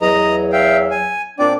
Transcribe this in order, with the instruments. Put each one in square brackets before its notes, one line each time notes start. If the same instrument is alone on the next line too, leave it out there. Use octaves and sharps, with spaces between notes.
[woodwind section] E2 F#3 [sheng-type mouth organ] D#5 A#5
[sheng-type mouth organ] E5 F5 G5
G#5
[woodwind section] A#2 C4 D4 [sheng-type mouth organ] D5